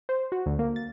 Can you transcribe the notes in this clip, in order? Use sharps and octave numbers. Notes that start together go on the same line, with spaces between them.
C5
F#4
D2
A#3
A6